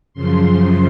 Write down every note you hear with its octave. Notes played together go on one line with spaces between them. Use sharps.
F#2 C#3 F3 C6